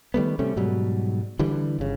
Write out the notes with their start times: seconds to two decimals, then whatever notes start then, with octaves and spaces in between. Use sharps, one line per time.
0.14 D#3 G3 A3 B3
0.39 C3 G3 A3 C#4
0.57 G#2 B2 F#3 G3
1.39 D3 E3 G3
1.79 G1 C#3